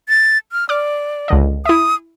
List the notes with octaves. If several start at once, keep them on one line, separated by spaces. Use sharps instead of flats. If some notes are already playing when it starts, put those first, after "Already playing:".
A6
F6
D5 D6 F6
C#2 D3 D#5
E4 E5 D#6